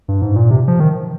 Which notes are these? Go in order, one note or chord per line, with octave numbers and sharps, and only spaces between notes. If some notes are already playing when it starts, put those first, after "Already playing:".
G2
G#2
A#2
C3
F3
D#3